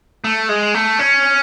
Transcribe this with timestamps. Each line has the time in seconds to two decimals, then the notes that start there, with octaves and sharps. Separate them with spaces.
0.24 A3
0.49 G#3
0.74 A3
0.99 C#4